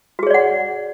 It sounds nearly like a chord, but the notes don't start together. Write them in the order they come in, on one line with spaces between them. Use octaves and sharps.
F#4 G#4 C#5 D5 F#5